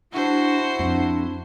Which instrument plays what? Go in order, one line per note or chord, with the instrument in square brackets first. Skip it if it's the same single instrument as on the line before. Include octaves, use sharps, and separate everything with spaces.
[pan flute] D4 [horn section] E4 [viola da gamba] F#4 C5
[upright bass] F2 [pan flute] D4